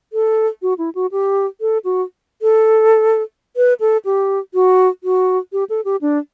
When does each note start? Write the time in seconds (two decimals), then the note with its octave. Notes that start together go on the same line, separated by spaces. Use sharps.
0.13 A4
0.62 F#4
0.78 E4
0.95 F#4
1.12 G4
1.61 A4
1.85 F#4
2.42 A4
3.57 B4
3.80 A4
4.05 G4
4.54 F#4
5.04 F#4
5.53 G4
5.69 A4
5.85 G4
6.01 D4